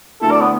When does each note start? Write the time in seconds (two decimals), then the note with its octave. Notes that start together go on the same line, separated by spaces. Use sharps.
0.21 D2 D3 A3 E4 A4
0.31 D5
0.41 B3